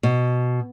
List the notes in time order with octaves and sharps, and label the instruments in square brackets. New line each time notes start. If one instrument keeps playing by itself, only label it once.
[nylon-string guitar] B2